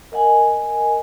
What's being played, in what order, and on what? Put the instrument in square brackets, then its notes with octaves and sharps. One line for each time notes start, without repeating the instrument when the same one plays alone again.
[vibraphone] A#4 D#5 F#5 G#5